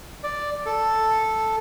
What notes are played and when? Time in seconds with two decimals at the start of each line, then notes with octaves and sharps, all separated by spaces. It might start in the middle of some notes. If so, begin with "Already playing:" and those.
0.24 D5
0.66 A4